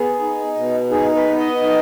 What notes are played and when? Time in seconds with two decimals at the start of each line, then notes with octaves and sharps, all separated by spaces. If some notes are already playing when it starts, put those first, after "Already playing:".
Already playing: B3 G#4
0.19 D#4
0.55 B2
0.90 D#4 G#4
1.15 B4
1.27 B3
1.39 D#5
1.62 D#4